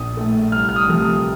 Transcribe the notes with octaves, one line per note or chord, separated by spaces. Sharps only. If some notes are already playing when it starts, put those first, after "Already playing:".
Already playing: A#1 D#6
A2 A3
C2 F6
F6
D#6
C3 F3 A3
D#6